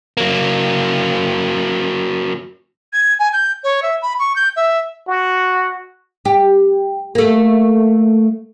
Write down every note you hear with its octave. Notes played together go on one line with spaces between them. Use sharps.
F#3 A#3
G#6
G#5
G6
C#5
E5
B5
C#6
G6
E5
F#4
G4
A3 A#3